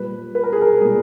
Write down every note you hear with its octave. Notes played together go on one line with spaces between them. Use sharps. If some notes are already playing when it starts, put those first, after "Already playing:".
Already playing: A#2 G3 B4
B4
A#4
G#4
A#4
A#2 G3 G#4